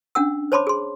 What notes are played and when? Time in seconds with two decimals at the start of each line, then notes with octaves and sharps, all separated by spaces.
0.15 C#4 D4 F#5 E6
0.52 C5 C#5 A5 B5 C6 D6
0.67 G#4 C6